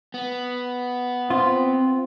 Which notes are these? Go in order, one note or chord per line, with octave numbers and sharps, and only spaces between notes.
B3
C4 F4